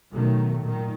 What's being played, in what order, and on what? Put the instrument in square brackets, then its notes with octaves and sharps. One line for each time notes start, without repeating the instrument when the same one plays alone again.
[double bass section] B2 D#3 F#3 A3
A#2 D#3